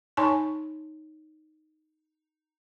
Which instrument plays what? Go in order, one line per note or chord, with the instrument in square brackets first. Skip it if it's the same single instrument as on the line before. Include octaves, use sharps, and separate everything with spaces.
[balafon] D#4 C#5 G#5 A5 C6 C#6